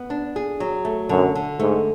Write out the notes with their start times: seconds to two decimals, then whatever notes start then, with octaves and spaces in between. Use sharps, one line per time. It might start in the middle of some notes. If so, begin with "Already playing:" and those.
Already playing: B3
0.10 D4
0.36 G#4
0.60 F#3
0.85 A3
1.09 F#2 D3
1.35 D3
1.60 G#2 A3